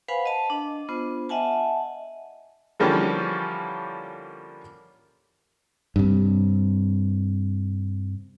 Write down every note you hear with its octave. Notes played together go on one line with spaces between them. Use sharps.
B4 C5 F5 F#5 G#5 B5
D#5 A5
D4
B3 D4 F4 C5
D#5 E5 F#5 G#5 A5
D3 E3 F3 G3 A#3 C#4
G2 C3